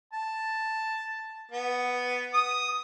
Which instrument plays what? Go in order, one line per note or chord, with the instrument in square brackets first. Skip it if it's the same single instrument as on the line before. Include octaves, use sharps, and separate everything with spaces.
[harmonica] A5
B3
D#6